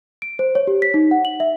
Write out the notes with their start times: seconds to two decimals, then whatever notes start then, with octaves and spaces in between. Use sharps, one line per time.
0.22 D7
0.39 C5
0.55 C#5
0.67 G4
0.82 B6
0.94 D#4
1.11 F#5
1.25 F#7
1.40 E5